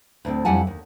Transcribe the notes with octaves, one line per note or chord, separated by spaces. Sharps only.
D2 A2 C4
F2 G3 E4 F#5 G#5 A5
D#2